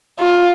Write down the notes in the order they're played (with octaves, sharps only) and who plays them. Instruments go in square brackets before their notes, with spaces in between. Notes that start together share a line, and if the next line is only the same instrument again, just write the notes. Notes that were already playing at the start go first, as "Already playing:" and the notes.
[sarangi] F4